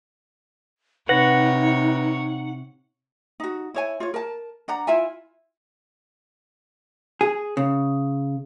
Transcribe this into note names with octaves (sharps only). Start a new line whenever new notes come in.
C3 D#4 B4 C#5 F#5 A#6
D#4 F#4
E4 C#5 G#5
F4 C#5
A#4 A5
D4 F#5 A#5
E4 F4 E5 G#5
G#4
C#3